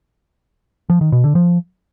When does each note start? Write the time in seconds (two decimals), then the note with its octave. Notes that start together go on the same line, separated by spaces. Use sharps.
0.90 F3
1.01 D#3
1.12 B2
1.24 D3
1.35 F3